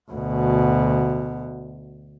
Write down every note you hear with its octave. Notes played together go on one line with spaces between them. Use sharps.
D2 B2